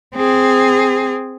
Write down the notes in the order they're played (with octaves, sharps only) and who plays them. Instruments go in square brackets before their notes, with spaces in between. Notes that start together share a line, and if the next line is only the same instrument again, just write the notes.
[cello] C4 G#4